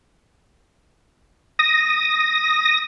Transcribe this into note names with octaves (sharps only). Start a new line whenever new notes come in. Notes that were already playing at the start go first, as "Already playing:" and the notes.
D#6 A#6